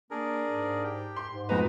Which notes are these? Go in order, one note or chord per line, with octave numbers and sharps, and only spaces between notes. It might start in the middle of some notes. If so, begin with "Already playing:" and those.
A#3 D4 G#4 A#4
G#2
G4
C6
G#2
F2 B2 G#3 F#4 B4 A#5